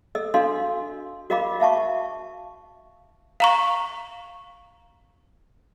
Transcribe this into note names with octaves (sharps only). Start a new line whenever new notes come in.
A4 D#5 E6
D4 F#4 A4 D#5 F5 C6
F#4 A#4 D#5 F5 B5 D6
E5 F5 A5 C#6
F5 A#5 C#6